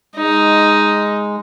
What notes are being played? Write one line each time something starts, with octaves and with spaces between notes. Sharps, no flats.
G#3 D#4